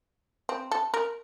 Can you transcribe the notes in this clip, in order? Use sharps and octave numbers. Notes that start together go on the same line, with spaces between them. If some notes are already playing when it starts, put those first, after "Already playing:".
C4
A4
A#4